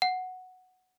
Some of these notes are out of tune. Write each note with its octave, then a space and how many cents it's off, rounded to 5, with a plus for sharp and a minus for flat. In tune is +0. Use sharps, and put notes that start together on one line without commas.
F#5 +0